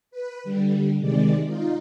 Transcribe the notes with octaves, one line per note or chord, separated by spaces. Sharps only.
B4
D3 G3
C3 D#3 G#3 D5
D#4 F4